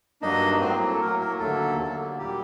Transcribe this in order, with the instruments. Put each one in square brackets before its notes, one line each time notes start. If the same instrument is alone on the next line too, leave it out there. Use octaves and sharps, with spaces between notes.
[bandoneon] G2 F#3 A#3 D4 D#4 D#5
A2 F#3 A#3 C4 C5
A4
A2 F#3 A#3 A#4
A#3 A#4
D#2 D3 F#3 A3 A#3 A4
D#2 D3 F#3 A#3
A#2 F#3 G3 A#3 G4